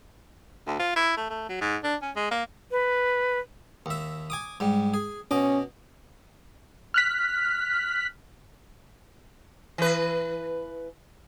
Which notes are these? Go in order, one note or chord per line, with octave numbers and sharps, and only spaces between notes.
D2
F4
E4
A3
A3
F#3
G#2
D4
C#4
G#3
A#3
B4
D#2 E5
G#5 D6 D#6
G#2 G3
G#4
B2 C#4 D#5 D6
F6 F#6 B6
E3 B4